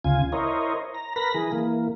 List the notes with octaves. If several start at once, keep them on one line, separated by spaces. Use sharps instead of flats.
D2 C#3 F4 G#5
E4 A#4 C5 C#5 D#5
A#5
A#4 B4 B5 A#6
E3 G#4
E3 A#3